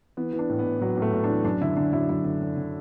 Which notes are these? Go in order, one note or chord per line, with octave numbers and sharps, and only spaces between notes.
E3 B3
E3
D4
A2
B3
A2
A2 F#3
A2 A3
A2
D4
E3
F#2 D4
D3 E4
D3 D4
F#2 E4
F#2 E4
D3
D3
D3